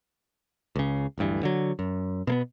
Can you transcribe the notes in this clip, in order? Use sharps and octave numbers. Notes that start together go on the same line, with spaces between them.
C#2 C#3
D1 A1 G2 E3
D3 F#3
F#2
B2 A#3 B3